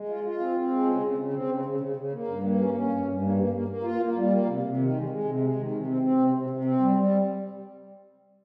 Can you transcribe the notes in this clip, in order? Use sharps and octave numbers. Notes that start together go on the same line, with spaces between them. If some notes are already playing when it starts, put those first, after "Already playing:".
Already playing: G#3
F4
F4
C4
C4
G#3
C#3
C#3
C#3
C4
C#3
C#3
C#3
C#3
A#3
G2
A#3
C#4
C#4
G2
G2
A#3
A#3
A#3
A#3
F4
A#3
G3
A#3
C3
C3
D#3
G#3
G#3
C3
G#3
D#3
C3
C4
C4
C3
C3
C3
C4
G3
G3